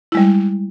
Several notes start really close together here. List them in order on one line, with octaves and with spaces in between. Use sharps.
E4 G#3 G3